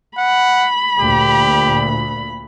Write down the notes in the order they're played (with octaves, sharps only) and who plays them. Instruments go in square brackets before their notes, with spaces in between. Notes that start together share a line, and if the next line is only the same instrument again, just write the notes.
[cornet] F#5 [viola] B5
[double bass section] D2 A#2 [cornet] G4